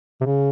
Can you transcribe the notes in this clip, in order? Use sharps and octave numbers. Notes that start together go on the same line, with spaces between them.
C3
C#3